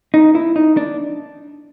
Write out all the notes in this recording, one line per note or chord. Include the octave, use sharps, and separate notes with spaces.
D#4
E4
D#4
D4